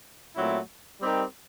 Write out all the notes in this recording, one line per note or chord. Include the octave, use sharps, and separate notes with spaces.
A#2 F#3 A3 C4 E4
G3 C4 D#4 G4 A#4